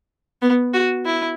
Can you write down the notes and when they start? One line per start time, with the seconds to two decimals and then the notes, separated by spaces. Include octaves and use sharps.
0.42 B3
0.74 F#4
1.05 E4